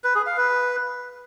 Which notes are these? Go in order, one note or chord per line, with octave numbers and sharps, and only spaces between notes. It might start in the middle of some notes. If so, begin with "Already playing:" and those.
B4
G#4
F5
B4